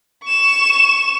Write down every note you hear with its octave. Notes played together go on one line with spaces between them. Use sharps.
C#6 E7